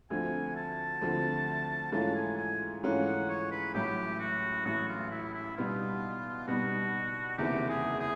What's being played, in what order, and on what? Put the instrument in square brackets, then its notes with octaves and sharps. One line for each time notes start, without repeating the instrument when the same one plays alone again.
[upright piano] D2 D3 F3 A3 C4 [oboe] G#5
[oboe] A5
[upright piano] D2 D3 F3 A3 C4
[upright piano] G#2 E3 A3 C#4 F4 [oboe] A5
[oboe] G#5
G#5
[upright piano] G#2 E3 A3 C#4 F4 [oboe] F#5
[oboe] F#5
C#5
B4
[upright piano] A1 A2 F#3 [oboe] G4
[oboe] F#4
[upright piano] A1 A2 F#3 [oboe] F#4
[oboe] F4
E4
E4
[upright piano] B2 G3 B3 D#4 [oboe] F4
[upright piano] B2 G3 B3 D#4 [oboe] F#4
[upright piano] F#1 E2 C3 D#3 [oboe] G4
[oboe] G#4
G#4